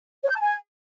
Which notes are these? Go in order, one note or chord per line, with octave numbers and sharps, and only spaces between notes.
C#5
G6
A5
G#5